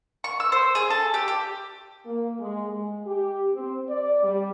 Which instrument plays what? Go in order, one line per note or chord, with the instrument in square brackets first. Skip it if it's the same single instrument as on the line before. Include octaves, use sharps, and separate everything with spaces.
[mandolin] C#6
E6
C5
G#4
A4
G4
G4
[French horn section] A#3
G#3
G#3
G4
C4
D5
G3